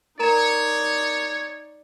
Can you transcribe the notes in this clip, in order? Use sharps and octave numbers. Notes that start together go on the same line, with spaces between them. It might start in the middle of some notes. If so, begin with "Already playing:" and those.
D#4 A#4 C#5 D5 A#5 E7